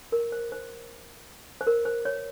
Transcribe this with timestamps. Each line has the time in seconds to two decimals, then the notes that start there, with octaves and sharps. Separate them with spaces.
0.12 A#4
0.32 C5
0.52 C5
1.61 C5
1.67 A#4
1.85 C5
2.05 C#5